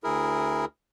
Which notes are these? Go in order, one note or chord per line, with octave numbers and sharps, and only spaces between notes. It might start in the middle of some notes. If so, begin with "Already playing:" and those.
D2 E4 G#4 A#4